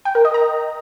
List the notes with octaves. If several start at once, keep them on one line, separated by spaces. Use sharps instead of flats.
G5
A#4
D#5
A#5